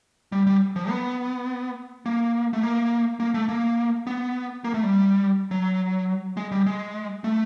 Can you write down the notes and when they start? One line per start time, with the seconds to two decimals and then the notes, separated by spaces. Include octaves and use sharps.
0.32 G3
0.47 G3
0.76 F3
0.89 B3
2.06 A#3
2.53 A3
2.63 A#3
3.20 A#3
3.34 A3
3.49 A#3
4.07 B3
4.64 A#3
4.74 A3
4.83 G3
5.51 F#3
6.37 G#3
6.52 G3
6.66 G#3
7.24 A3